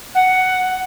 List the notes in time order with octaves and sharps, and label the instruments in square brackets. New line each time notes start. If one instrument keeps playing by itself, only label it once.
[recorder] F#5